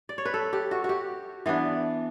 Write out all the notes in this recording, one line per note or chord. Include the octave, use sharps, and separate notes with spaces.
D5
C#5
B4
A4
G4
F#4
F#4 G4
E3 B3 D4